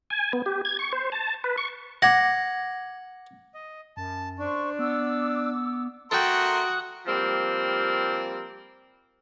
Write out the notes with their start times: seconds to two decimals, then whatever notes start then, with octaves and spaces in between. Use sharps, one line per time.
0.10 G#5
0.33 B3
0.46 G4
0.65 G#6
0.79 C#6
0.93 C5
1.12 A5
1.44 B4
1.58 C#6
2.02 F#5 D6 G#6 A#6
3.54 D#5
3.97 F#2 A5
4.39 D4 C5 C#6
4.79 B3 D6 E6
6.11 A3 F#4 A4 A#4 G5 C6 D#6 F#6
7.06 F3 G3 A#3 C4